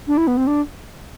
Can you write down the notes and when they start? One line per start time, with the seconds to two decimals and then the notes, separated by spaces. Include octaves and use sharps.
0.08 D4
0.17 E4
0.27 B3
0.37 C4
0.47 D4